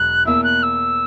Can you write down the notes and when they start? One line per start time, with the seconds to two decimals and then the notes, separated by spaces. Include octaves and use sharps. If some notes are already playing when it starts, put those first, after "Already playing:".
Already playing: E1 F#3 F#6
0.25 E2 B2 A#3 E4 E6
0.43 F#6
0.62 E6